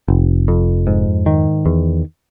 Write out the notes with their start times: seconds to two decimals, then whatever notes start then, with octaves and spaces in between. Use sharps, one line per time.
0.08 F1
0.48 F2
0.87 G#2
1.26 D#3
1.66 E2